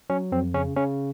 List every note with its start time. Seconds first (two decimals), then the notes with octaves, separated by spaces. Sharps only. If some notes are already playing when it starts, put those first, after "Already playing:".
0.10 F#3 C#4
0.32 F2 C4
0.54 C#3 C#4
0.76 C#3 C#4